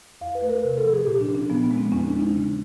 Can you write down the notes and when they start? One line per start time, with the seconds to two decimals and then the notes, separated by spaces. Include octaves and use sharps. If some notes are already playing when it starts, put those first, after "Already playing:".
0.21 E2 F5
0.35 B4
0.42 A3
0.49 A#4
0.64 C3
0.78 A4
0.85 F3
0.93 G#4
1.06 A#2 G4
1.21 D4
1.29 A#2
1.35 C#4
1.50 F3 B3
1.64 B3
1.71 G#3
1.78 C4
1.92 E2 C#4
2.07 D4
2.13 G#3
2.20 D#4
2.35 C#3